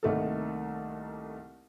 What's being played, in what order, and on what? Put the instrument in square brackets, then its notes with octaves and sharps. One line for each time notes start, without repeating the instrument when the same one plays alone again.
[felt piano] C2 D#3 A3 A#3 A4